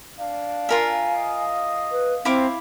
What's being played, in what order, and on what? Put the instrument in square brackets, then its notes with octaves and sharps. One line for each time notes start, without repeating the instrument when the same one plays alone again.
[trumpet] D4 [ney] F5
[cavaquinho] F4 A#4 E5 [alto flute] G#5
[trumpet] D#5
[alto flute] B4
[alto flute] C4 [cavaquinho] E4 F5 D6